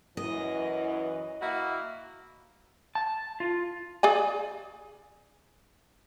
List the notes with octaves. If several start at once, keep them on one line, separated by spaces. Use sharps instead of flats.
F#2 E3 D#5
A#3 E4 F#4
A5
F4
G#4 D5 G#5